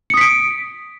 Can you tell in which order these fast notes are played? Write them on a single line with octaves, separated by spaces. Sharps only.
C#7 D#6 B6 D7